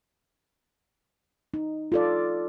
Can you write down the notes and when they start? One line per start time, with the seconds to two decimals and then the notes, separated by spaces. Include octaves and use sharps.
1.54 D#4
1.92 F4 A4 D5